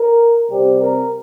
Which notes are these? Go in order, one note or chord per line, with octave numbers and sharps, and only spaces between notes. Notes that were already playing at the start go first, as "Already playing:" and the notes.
Already playing: A#4
C3 G3 C4 G4
A#4